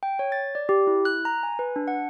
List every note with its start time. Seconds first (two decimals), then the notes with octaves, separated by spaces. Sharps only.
0.03 G5
0.19 C#5
0.32 A6
0.55 D5
0.69 G4
0.87 E4
1.05 F#6
1.25 A#5
1.43 G#5
1.59 B4
1.76 D4
1.88 F#5